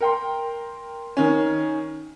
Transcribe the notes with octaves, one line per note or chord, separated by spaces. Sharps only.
A#4 G5 C6
D#3 C#4